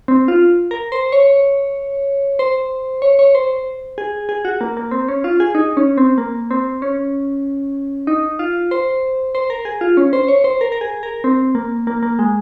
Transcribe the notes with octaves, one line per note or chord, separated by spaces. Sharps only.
C4
F4
A#4
C5
C#5
C5
C#5
C#5
C5
G#4
G#4
F#4
A#3
A#3
C4
C#4
F4
G#4
D#4
C#4
C4
A#3
C4
C#4
D#4
F4
C5
C5
A#4
G#4
F4
C#4
C5
C#5
C5
A#4
A#4
G#4
A#4
C4
A#3
A#3
A#3
G#3